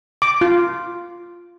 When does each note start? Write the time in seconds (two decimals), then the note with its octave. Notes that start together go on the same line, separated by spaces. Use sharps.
0.22 D6
0.41 F4